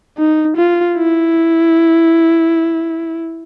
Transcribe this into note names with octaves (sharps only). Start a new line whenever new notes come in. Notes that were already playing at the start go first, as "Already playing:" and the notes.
D#4
F4
E4